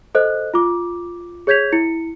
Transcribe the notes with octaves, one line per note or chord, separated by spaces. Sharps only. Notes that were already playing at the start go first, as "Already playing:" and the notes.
A4 C5 D#5 F#6
F4 D6
G#4 C#5 G6 G#6 B6 F7
E4 C#7